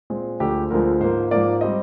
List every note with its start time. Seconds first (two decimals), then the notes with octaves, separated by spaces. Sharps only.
0.10 A#2 G#3 C4
0.40 D2 D3 F3 G#3 G4
0.70 D2 D3 F3 G#3 A#4
1.00 G#2 F3 A#3 C5
1.31 G#2 F3 A#3 D5
1.61 G3 C4 D#5